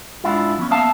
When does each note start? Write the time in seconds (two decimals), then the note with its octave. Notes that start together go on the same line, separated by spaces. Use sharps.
0.24 G#2 D4 E4 F4
0.58 F3 B3 C#4
0.70 A#3 B3 E5 F5 A5